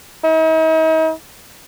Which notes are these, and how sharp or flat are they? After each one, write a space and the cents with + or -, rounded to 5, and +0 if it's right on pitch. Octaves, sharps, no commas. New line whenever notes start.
D#4 +45